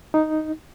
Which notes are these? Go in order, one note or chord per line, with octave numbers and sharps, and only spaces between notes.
D#4